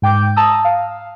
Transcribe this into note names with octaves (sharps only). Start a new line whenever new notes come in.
G#2 G5 D6 G6
A5 A#5 D#6 E6
F5